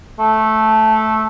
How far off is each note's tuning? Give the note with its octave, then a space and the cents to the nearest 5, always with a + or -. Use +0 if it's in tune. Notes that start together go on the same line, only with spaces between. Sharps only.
A3 -10